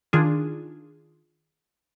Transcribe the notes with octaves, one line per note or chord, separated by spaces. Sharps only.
D#3 D4 F4 G#4